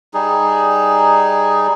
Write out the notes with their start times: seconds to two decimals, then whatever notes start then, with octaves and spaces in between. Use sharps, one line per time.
0.14 G3 D#4 G#4